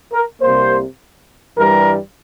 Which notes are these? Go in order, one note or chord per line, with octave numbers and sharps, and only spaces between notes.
A#4
C2 C3 G3 A#3 C5
G2 E3 G3 A#4